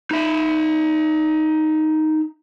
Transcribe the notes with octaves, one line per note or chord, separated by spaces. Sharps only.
D#4 E5